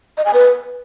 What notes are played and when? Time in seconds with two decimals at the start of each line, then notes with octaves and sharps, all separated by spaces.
0.18 D#5
0.26 G#5
0.34 B4